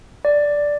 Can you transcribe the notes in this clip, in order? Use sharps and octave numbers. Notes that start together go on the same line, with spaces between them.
D5